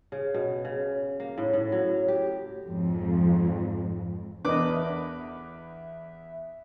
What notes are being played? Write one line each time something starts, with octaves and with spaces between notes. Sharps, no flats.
C#3
B2
C#3
A#3
A2
A2
F#3
G4
F2 G#2
E2 D4 A#4 B4 D#5 D6
E5